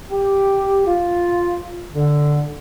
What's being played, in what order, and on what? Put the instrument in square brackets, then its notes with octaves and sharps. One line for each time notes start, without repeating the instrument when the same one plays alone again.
[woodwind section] G4
F4
D3